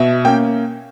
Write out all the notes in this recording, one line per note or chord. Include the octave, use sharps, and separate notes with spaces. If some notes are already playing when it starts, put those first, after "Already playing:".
Already playing: B2 E5
A#3 C#4 G5